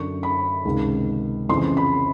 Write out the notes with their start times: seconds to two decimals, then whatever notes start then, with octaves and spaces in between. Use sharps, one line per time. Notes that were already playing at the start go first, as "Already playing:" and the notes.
Already playing: F#2 D3 C#6
0.23 B5
0.65 C#2 C3 D#3
1.49 F2 C#3 E3 C6
1.77 B5